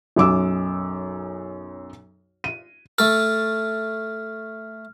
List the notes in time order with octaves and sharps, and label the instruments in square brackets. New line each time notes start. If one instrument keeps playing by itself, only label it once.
[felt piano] B1 F#2 D6 E6
D#7
[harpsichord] A3 A4 [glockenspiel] F6